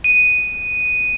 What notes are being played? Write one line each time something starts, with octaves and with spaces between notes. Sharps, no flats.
D#7